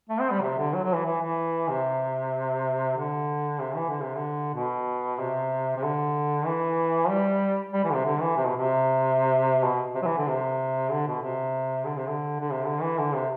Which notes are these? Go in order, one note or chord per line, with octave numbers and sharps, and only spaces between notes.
A3
C4
G3
C3
D3
F#3
F#3
E3
E3
E3
C3
D3
C3
E3
D3
C3
D3
B2
C3
C3
D3
E3
G3
G3
E3
D3
C3
D3
E3
C3
B2
C3
B2
C3
F#3
E3
D3
C3
D3
B2
C3
D3
C3
D3
D3
C3
D3
E3
D3
C3